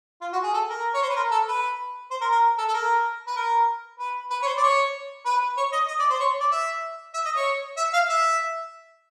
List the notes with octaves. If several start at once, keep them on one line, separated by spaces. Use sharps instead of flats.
F4
F#4
G#4
A4
A#4
C#5
C5
B4
A#4
A4
B4
C5
A#4
A#4
A4
A4
A#4
B4
A#4
B4
B4
C#5
C5
D5
C#5
B4
C#5
D#5
D#5
D5
C5
C#5
D5
E5
E5
D#5
C#5
E5
F5
E5